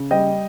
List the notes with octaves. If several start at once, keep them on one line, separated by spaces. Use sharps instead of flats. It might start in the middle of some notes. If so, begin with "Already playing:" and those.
Already playing: C#3
G3 D#5 G5